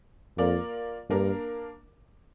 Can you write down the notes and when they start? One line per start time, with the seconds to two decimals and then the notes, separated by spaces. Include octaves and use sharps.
0.38 F2 A#3 F4 A#4 D5
1.10 G2 A#3 D4 A#4